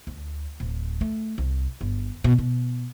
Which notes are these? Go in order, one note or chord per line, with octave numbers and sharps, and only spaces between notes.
D2
D1
A3
C2
G1
B2
B2